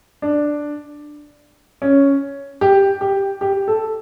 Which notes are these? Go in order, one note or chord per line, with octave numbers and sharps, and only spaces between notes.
D4
C#4
G4
G4
G4
A4